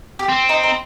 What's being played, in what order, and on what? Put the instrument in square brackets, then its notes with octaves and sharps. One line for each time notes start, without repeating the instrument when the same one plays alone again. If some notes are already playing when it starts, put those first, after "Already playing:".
[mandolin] G4
[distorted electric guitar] C4
[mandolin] D#4
D#4